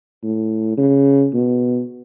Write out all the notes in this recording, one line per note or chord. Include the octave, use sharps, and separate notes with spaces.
A2
C#3
B2